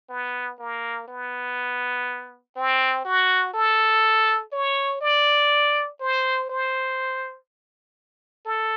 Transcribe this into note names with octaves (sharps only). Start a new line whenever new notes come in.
B3
A#3
B3
C4
F#4
A4
C#5
D5
C5
C5
A4